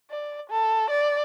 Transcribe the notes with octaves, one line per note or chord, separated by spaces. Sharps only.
D5
A4
D5